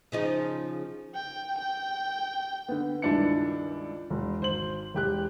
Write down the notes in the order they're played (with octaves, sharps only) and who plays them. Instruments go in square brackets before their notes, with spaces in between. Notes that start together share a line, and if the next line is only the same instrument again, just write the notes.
[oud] C#3 F3 D#4
[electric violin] G5
G5
[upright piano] D3 B3
C#2 G2 D#3 D4 E4 C#7
E1
G#1 C5 F#7
E1 G4 F#6